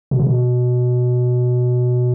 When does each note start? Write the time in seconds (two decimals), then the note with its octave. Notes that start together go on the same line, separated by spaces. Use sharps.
0.11 B2
0.19 C#3
0.27 B2